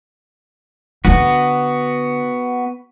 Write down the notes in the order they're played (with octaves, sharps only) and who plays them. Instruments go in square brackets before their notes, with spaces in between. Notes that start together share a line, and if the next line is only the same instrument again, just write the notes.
[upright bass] D3 D4 [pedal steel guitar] B3 F#4